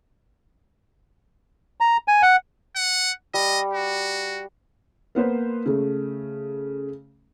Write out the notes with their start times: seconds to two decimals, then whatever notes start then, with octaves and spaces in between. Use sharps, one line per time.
1.80 A#5
2.08 G#5
2.22 F#5
2.76 F#5
3.34 G3 D#5
3.73 F#4
5.15 A#3 B3 B4 C5
5.66 C#3 A3